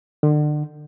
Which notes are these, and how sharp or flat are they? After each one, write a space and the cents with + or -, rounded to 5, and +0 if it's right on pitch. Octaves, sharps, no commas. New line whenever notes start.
D3 +35